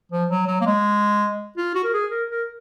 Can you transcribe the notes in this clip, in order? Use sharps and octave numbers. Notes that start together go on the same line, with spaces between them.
F3
F#3
F#3
A#3
G#3
F4
F#4
A#4
G#4
A#4
A#4